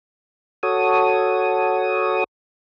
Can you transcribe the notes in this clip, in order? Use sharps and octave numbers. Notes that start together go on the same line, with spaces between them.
F#4 A4 C#5 D#6